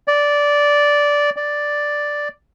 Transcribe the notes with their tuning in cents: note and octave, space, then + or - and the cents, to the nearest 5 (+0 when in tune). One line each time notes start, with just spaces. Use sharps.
D5 -10
D5 +0